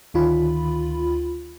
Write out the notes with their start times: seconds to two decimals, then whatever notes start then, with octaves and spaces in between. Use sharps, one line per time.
0.14 D2 D#3 F4 B5